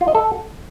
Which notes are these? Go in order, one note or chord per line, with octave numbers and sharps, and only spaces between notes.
F4
D#5
A4